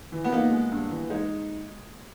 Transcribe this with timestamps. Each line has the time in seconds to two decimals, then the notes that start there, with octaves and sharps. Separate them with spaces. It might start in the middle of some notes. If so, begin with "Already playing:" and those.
0.12 E3
0.24 B3
0.32 A#3 D#4
0.51 G#3
0.71 G2
0.90 E3
1.10 G#3 D#4